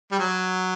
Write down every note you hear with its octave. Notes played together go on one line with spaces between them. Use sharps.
G3
F#3